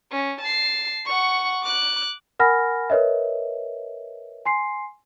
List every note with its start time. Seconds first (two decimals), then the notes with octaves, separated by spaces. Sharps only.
0.11 C#4
0.41 A5 C7
1.05 F#5 C#6
1.62 D6 F#6
2.39 A#4 F#5 G#5 B5 F6 A#6
2.90 A#4 B4 C#5 D#5 E5
4.45 G#5 C6 C7